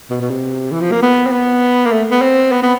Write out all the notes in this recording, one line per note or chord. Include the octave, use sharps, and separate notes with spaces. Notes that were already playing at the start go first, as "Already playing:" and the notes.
B2
B2
C3
E3
F3
A#3
B3
C4
B3
A#3
A3
B3
C4
B3
B3